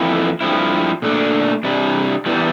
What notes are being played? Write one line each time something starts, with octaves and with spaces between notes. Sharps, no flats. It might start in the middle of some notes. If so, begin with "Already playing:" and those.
Already playing: F2 E3 A#3 E4
G2 F3 C4 E4
A#2 A3 D4
C3 G3 D4
E2 E3 G3